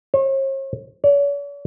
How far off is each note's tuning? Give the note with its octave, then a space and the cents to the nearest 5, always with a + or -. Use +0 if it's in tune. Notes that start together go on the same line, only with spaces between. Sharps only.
C#5 -45
C#5 +45